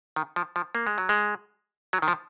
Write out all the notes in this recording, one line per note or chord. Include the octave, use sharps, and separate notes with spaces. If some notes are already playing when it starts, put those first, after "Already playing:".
D#3
F3
F3
A#3
G#3
F#3
G#3
F#3
D#3
F3